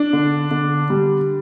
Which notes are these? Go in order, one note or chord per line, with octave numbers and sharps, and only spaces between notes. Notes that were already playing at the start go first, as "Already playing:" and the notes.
Already playing: D4
D3
D3
G3